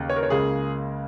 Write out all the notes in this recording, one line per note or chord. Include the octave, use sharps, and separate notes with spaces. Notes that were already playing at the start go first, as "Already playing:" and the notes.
Already playing: D#2 C#3
C#5
A#4
C#5
C#2 C#3 A#3 G#4